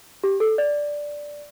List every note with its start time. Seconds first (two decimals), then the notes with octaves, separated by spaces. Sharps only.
0.24 G4
0.40 A4
0.58 D5